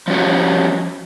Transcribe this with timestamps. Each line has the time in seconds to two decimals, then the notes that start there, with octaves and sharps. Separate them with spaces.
0.08 F3 G3 C#4 F#4 C#5